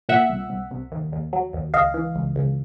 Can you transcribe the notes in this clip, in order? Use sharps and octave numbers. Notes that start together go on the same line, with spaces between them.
A#2 E5 F#5
C2
C2
C2
D#2
D#2
F#3
D#2
C#2 D#5 F5
E3
C#2
C#2